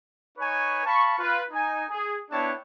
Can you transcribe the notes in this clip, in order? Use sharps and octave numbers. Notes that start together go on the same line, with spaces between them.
D#4 B4 C#5 G#5 C#6
F5 A5 B5 C#6
F4 B4
D#4 G#5
G#4
B3 D4 E4 C#5 G5 A5